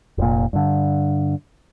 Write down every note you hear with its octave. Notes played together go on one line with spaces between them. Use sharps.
F1 A#2
G2 D3